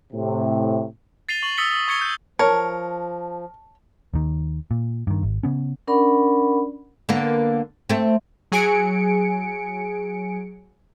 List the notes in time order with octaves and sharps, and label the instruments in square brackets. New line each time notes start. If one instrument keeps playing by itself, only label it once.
[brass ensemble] A2 C3
[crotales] A6 C7 D#7 F7 G7
C#6 F#7
D#6 E6 A6 B6 C#7 G7
D#6
C#6 G#6 C#7 G7
G6
[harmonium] F3 [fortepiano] A#4 [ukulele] C#5 [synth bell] A5
[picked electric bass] D#2 D#3
A#2
G2 D#3
G#1
C#3 B3 C#4
[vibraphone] C#4 D4 A#4 D5 F#5 B5
[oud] D3 A#3 B3
A3 C4
[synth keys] F#3 G#4 G#5 C#7 D7